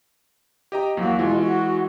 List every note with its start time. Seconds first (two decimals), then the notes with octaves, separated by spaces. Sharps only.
0.72 G4 D#5 A#5
0.97 E2 F#3 A#3 F#4
1.19 B2 E3 G#3 F4
1.41 F#4